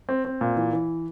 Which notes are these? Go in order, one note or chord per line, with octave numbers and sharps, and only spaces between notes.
C4
C4
A#2
E3
E3